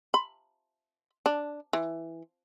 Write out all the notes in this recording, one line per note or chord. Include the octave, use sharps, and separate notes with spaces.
B5
D4
E3